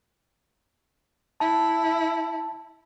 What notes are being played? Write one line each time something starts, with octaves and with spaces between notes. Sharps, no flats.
E4 A5